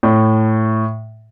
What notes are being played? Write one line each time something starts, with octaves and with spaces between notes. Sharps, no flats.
A2